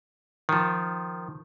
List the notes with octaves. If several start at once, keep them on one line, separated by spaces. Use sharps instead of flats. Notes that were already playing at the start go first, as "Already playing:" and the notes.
D#3 F3